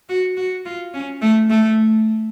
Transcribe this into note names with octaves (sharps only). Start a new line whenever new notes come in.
F#4
F#4
F4
C#4
A3
A3